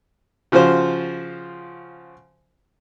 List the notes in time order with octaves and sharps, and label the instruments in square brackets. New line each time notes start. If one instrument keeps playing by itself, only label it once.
[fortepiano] C#3 F3 F4 F#4 C5